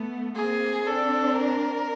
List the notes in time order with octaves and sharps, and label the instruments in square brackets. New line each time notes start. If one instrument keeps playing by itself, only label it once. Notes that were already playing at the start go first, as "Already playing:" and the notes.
Already playing: [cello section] A3 B3
[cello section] A#3 C4 [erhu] G#4
[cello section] C4 D4 [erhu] A4
[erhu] A#4